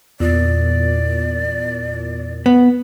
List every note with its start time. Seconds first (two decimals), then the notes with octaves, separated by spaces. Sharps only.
0.20 E2 A#2 D5
2.46 B3